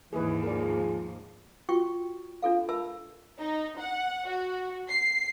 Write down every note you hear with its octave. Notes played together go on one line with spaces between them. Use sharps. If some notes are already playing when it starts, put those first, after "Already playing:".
D#2 G#2 E3 G#4 B4
F3 G#4 A#4 D5
F4 F#4 G5 C#6
D4 F4 A4 F5
A#4 E5 A5 B5 E6
D#4
F#5
F#4
C7